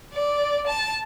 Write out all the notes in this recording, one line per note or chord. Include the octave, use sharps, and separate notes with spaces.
D5
A5